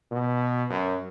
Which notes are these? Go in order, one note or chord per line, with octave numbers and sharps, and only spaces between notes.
B2
F#2